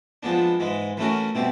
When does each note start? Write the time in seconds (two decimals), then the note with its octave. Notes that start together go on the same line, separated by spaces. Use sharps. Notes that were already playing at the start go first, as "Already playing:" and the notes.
0.23 F3 G#3 B3 D4
0.60 G#2 E3 G#3
0.97 E3 A3 C#4 F#4 A#4
1.35 B2 G3 C4 E4